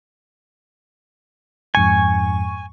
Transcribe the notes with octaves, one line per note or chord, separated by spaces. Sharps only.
F2 G#2 G#5 C#6